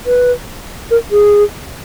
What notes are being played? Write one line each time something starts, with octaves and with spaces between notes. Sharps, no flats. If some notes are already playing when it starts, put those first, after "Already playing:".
B4
A#4
G#4